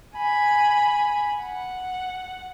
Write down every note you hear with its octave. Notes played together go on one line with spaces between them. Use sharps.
G#5 B5
F#5